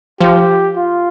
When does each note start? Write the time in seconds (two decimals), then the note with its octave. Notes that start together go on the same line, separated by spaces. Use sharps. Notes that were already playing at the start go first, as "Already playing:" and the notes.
0.20 F3 G4
0.75 F4